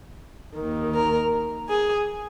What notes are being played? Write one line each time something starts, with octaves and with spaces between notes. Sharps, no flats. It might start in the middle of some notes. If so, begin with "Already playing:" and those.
D#2 D#3
A#4
G#4